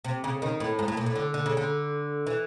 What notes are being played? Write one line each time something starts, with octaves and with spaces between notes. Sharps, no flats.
C3
C#3
D#3
A2
G#2
A2
A#2
A2
D3
D3
C#3
D3
E3